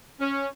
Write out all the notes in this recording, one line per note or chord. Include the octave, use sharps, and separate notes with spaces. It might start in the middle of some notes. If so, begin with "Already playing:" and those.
C#4